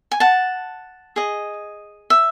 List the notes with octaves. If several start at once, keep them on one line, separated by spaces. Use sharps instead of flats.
G#5
F#5 A5
G#4 D#5
E5